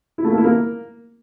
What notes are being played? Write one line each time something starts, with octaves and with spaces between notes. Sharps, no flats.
E4
A3
A#3
E4
A#3